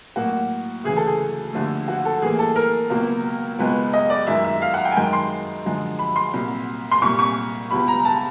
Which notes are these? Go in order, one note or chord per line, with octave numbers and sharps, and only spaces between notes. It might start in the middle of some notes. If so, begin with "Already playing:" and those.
A2 F#3 A#3 F#4
D2 C#3 E3 G#4
A4
G#4
D#2 D3 F3 A3
F#4
A4
A2 E3 G3 A#3 G#4
A4
A#4
C#2 B2 F#3 A#3
C#2 B2 G#3 B4
D#5
D5
F#2 D#3 G#3 E5
E5
F5
F#5
G5
G#5
F#2 D#3 G#3 G5
C6
F#2 D3 F3 G#3
B5
C6
C2 A#2 F#3
C6
C2 A#2 G3 C#6
C#6
C#2 B2 G3 B5
A#5
A5